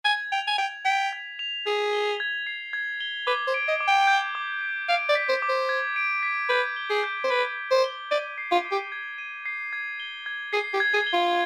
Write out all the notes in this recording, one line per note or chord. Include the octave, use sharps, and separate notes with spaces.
G#5 G#6
G5 F7
G#5
G5 G#6
G5 B6
G#6
F7
G#4 G#6
G7
G#6
C7
G#6
G7
B4 D6
C5
D7
D#5
D6
G5
G6
D6
D7
F5 D7
D5
B6
C5
D6
C5
G#6
D7
B6
B4 G6
G7
G#4
G6
C5
B4 D7
G6
C5
G7
D5 D#7
C7
F4
D6
G4
G#6
D#7
C7
G#6
G7
G#6
G#4 C7
G4
G#6
G#4
G7
F4